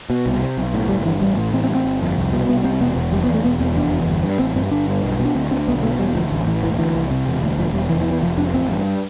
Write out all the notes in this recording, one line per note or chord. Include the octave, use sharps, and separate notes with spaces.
B2
C2
C3
B1
A2
G1 G3
G2 E3
A1 G3
A2
A1 C4
C4
G2
C4
G1
F2
C2
B2
C2 B3
C3 C4
E1 B3
E2
F1 G3
B3
E2
A3
E1 B3
E2 C4
F1 D4
E2
G1
G2
A1 C4
G2 C4
G1 D4
G2
B1
B2
D4
D2 C4
D3 C4
B1 B3
B2 A3
E1 G3
D2 F3
A1
A2 E3
E1 E3
D2 E3
C2
C3
E1
D2
E1 F3
E2 G3
F1 E3
E3
E2
E3
F1 F3
F2 D4
A1 C4
G2